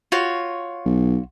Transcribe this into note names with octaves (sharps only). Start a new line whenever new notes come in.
F4 F#4 C#5
B1